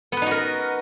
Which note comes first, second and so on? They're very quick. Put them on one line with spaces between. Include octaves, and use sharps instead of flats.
B3 B4 D#4 F#4 A#4